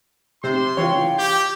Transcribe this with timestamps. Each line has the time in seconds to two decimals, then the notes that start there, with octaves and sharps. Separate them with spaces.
0.43 C3 G4 C5 C6
0.77 C#3 E3 F4 C#5 G5
1.18 G4 G6